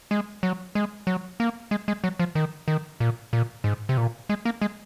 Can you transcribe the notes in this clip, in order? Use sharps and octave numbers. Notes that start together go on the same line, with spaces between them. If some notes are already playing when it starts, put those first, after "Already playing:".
G#3
F#3
G#3
F#3
A#3
G#3
G#3
F#3
F3
D#3
D#3
A#2
A#2
G#2
C3
A#2
G#3
A#3
G#3